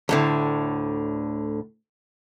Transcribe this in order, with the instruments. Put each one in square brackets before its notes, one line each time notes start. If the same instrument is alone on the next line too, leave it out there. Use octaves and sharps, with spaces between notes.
[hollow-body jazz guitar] D2 A2 D3